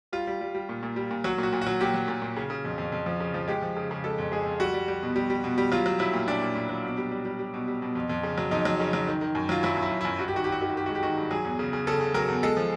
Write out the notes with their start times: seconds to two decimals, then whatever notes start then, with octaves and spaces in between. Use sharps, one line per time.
0.13 G3 F4
0.27 G3
0.41 G3
0.55 G3
0.69 A#2
0.83 A#2
0.96 G3
1.11 A#2
1.24 F#3 F#4
1.38 A#2 F#4
1.53 A#2
1.62 F#4
1.67 F#3
1.81 A#2 G4
1.94 F#3
2.08 A#2
2.22 A#2
2.36 C#3
2.50 C#3
2.65 F2
2.78 F2
2.92 F2
3.06 F3
3.20 C#3
3.34 F3
3.48 G#3 G4
3.62 F3
3.76 C#3
3.91 C#3
4.04 G#3 A4
4.18 F2
4.32 G#3 G#4
4.46 F2
4.60 G3 F#4
4.74 G3
4.88 G3
5.03 B2
5.16 G3
5.30 G3
5.44 B2
5.58 G3
5.72 F#3 F4
5.86 F#3
5.99 F#3 E4
6.13 A#2
6.28 A#2 D4
6.42 A#2
6.55 A#2
6.69 F#3
6.84 B2
6.97 G3
7.11 G3
7.25 G3
7.39 G3
7.54 B2
7.68 G3
7.82 B2
7.95 F2
8.10 F2
8.23 C#3
8.38 F#3
8.51 F2 D#4
8.65 F#3
8.80 C#3
8.93 F#3
9.07 D#3
9.21 D#3
9.35 F#2
9.49 F#3 F4
9.63 F#3 E4
9.77 F#2
9.82 E4
9.91 F#2
10.01 E4
10.05 F#2
10.19 G2 F#4
10.28 G4
10.33 D#3 F#4
10.44 G2 G4
10.52 F#4
10.61 D#3 G4
10.70 F#4
10.75 D#3 G4
10.86 G#3 F#4
10.95 G4
11.03 D#3 F#4
11.17 G2
11.31 F#3 G#4
11.44 E2
11.59 C#3
11.73 C#3
11.87 C#3 A4
12.01 C#3
12.14 F#3 A#4
12.28 E2
12.43 G#3 A4
12.57 F3